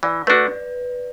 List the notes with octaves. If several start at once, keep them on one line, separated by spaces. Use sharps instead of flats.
E3 D5
A3 D4 F#4 B4